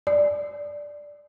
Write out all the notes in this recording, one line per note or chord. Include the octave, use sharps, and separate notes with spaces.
D5